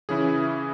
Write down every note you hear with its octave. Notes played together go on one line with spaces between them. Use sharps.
C#3 E3 C#4 E4 G#4